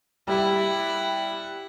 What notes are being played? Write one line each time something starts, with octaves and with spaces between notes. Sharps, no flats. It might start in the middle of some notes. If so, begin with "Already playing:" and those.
G3 E4 F#5